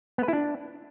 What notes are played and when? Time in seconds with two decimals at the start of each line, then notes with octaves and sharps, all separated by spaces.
0.18 B3
0.23 B4
0.28 E4
0.33 D4